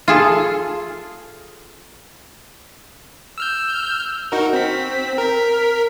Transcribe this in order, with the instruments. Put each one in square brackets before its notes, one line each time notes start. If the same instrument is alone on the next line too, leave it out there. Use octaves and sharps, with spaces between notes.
[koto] F4 G#4 A4
[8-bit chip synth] E6 F6 G6
D#4 F#4 A#4
C4 B6
A#4 B6